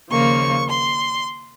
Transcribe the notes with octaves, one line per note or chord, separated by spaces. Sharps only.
D#2 C#3 F3 A#3 C#6
C6